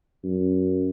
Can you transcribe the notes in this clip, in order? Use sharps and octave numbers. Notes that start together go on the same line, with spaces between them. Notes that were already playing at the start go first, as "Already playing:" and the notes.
F#2